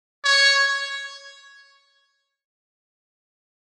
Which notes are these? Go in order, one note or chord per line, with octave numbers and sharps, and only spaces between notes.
C#5